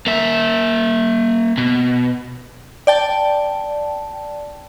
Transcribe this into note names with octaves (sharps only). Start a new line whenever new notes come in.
A#3 E5
B2
D5 G5 A5